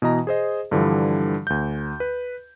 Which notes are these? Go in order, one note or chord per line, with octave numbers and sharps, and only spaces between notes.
B2 E3 D#5 A#5
G#4 C5 D#5
G2 D3 E3 F3 G3
D2 G6
B4